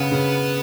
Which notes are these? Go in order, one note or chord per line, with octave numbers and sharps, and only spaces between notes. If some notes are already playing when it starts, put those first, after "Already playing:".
Already playing: C#3 B3
C#3